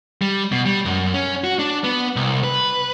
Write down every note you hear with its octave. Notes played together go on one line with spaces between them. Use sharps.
G3
B2
G3
F#2
C#4
F#4
D4
B3
C2
B4